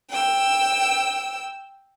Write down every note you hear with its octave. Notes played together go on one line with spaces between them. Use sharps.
G5 E6